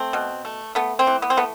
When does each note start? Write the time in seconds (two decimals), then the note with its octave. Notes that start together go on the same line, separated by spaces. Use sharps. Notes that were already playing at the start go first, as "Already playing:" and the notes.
Already playing: A3 C4
0.13 B2
0.45 A3
0.75 A3 B3
0.99 C4
1.07 E3
1.22 B3
1.30 C4
1.37 A3 B3